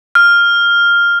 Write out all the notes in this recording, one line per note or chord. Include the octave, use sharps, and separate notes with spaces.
F6